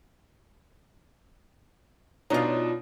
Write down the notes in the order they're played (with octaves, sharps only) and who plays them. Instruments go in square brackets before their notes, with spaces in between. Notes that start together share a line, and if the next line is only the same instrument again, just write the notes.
[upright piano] B2 D4 D#4 [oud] F4 C#5